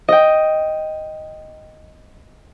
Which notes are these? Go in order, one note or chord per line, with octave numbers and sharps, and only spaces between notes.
D#5 G5